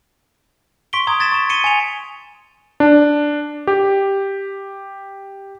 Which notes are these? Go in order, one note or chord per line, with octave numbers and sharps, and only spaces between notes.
C6 C#6 B6 D7 G7
A#5 C6 D#6 G#6
G#6 A6 B6 E7
C#6 E7
C#7 D#7 G7
G#5 F7
D4
G4